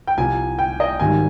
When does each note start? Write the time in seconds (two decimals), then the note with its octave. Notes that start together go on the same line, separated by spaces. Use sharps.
0.07 G5
0.17 C2 C3 F3 G#5
0.59 G5
0.80 D#5
1.00 G#1 G#2 D#3 G3 G#5